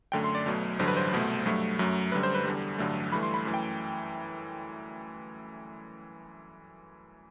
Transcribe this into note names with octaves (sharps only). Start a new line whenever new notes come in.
F#2 D3 A3 G5
C6
D5
B1 B2 F#3 A3
A1 G2 D3 F#3 C5
B4
C5
C2 B2 A3
G2 F#3 A3
F#2 F#3 A3
F#2 D3 G3 B4
C5
B4
E2 D3 G3
A1 G2 D3 F#3 A3
G2 E3 A3 B5
C6
B5
F#2 E3 A3
G5